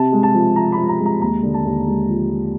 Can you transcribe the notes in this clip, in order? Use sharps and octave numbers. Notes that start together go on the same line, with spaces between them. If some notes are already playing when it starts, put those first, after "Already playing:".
Already playing: C3 A5
G#3
A5
F3
F3 A#5
B5
F3
A#5
G#3
A#5
D#2 A#5
D3
A5
D#2
G#3
F3
F3